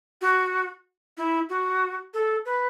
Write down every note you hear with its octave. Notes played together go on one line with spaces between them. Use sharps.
F#4
E4
F#4
A4
B4